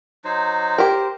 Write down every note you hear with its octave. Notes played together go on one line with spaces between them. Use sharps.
F#3 D#4 C5
G4 A#4 C5